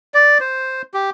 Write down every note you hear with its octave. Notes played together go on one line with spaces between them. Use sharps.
D5
C5
G4